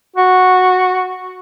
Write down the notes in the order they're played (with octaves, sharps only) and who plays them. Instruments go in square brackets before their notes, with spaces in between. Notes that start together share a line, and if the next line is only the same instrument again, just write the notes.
[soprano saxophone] F#4